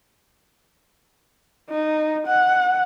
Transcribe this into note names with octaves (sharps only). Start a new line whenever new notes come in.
D#4
F#5